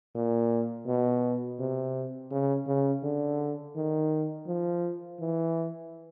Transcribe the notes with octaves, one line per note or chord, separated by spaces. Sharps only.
A#2
B2
C3
C#3
C#3
D3
D#3
F3
E3